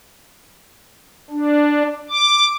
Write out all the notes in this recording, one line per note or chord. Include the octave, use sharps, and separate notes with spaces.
D4
D6